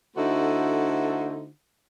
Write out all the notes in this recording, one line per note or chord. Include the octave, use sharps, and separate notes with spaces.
D3 A3 D#4 E4 F#4 C5